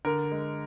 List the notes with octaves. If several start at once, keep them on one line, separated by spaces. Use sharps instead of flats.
D3 A#4
G#3